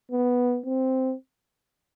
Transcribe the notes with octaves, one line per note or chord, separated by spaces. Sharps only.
B3
C4